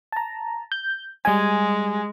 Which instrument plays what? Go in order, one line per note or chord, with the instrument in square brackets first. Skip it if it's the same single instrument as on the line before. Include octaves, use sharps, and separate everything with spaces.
[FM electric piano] A5 A#5
G6
[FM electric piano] G3 G#5 [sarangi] G#3